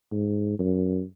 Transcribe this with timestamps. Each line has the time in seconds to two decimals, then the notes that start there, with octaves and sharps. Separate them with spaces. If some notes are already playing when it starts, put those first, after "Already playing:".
0.11 G#2
0.59 F#2